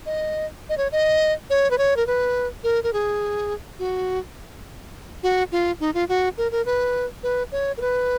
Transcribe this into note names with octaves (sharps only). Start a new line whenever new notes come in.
D#5
D#5
C#5
D#5
C#5
B4
C#5
A#4
B4
A#4
A#4
G#4
F#4
F#4
F4
D#4
F4
F#4
A#4
A#4
B4
B4
C#5
A#4
B4